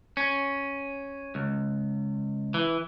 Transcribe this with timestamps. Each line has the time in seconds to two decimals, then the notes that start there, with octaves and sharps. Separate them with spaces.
0.17 C#4
1.35 C#2
2.54 E3